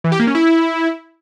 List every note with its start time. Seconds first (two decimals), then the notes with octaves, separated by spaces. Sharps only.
0.04 E3
0.12 G4
0.19 A#3
0.27 C#4
0.35 E4